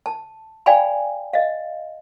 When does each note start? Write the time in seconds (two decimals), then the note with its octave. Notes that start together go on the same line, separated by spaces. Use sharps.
0.06 A5
0.66 D5 F5 G5 G#5 B5
1.33 D#5 F5